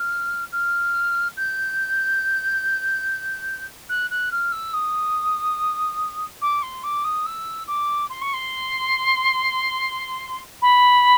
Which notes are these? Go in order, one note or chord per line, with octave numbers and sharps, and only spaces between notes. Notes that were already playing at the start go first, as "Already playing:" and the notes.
Already playing: F6
F6
G6
F#6
F#6
F6
E6
D#6
D6
C6
D6
D#6
E6
D6
C6
C#6
C6
B5